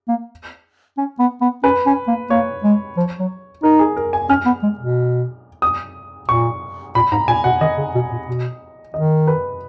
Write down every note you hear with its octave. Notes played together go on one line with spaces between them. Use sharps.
A#3
C#4
B3
B3
C#4 B4
C#4
A#3
A#3 C#5
G#3
F3
F#3
D#4 A#4
G#4
A#4
G#5
C#4 F6
B3
G#3
B2
D#6
A#2 C#6
A#2 B5
G#2 A#5
A#2 G#5
B2 F#5
D#3 D#5
C#3
B2
A#2
B2
D#3 D#5
B4